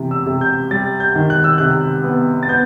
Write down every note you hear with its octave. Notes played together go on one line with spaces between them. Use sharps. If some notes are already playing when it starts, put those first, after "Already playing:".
Already playing: C3 E3
E6
C3
G6
G3 A6
G6
D#3
F#6
E6
C3 F#6
B3
A6
B3 G6